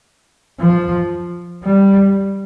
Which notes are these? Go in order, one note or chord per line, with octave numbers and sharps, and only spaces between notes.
F3
G3